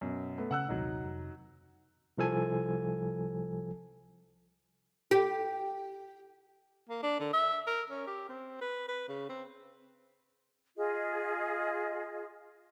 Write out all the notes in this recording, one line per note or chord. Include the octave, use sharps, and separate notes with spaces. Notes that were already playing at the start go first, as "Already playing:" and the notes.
F#2 B2
A3 B3
C#3 F#5 E6 F#6
A#1 D#2 C3 F#3 D#4
F1
C2 F3 A4 G#5
G4
A#3
D4
D3
E5
A#4
C#4
G4
C4
B4
B4
C#3
C4
F4 G#4 D#5